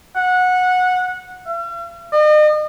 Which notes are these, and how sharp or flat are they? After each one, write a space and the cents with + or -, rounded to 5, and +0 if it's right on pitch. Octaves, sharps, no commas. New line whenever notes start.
F#5 -15
F5 -45
D#5 -40